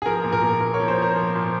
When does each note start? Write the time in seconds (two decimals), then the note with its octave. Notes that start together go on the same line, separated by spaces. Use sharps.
0.02 G#4
0.06 F3 A#4
0.24 A#2
0.32 A#4
0.42 A#2
0.60 A#2 A#4
0.74 C#5
0.80 F3
0.88 C5
0.98 F3 A#4
1.16 F3
1.35 A#2